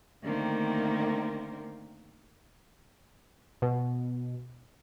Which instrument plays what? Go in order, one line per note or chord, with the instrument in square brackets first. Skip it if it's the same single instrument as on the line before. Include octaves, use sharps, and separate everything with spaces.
[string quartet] D3 D#3 A3 A#3 C4 A#4
[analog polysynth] B2